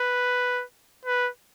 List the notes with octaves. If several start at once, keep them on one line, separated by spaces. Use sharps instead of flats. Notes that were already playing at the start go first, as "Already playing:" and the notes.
Already playing: B4
B4